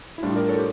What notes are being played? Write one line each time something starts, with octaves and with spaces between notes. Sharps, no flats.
E4
A2 G3 D4 F4
A#4 D5
A4 C#5
G4